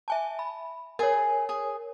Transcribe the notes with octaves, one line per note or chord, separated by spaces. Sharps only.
E5 G#5 A5
B5
G#4 A#4 C#5 G#5
G#4